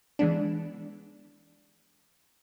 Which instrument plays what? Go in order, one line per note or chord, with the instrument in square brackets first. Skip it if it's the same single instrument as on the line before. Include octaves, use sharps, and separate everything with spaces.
[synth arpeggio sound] E3 G#3 B3 D4